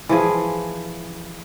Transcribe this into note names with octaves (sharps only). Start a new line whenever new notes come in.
E3 F3 G#4